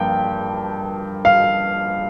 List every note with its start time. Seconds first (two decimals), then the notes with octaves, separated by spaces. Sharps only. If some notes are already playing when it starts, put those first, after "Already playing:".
Already playing: G2 F3 A#3 G5
1.25 F5